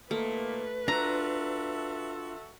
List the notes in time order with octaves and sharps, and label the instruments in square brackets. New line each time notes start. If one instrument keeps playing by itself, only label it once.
[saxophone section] A#2 D#3 A#3 [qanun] A3 [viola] B4
[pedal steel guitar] D4 F4 F#6 [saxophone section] F#4 A4 E5 [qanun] A#5